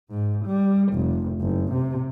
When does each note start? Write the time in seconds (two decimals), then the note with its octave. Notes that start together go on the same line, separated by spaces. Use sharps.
0.10 G#2
0.46 G3
0.94 F1
1.41 F#1
1.73 C3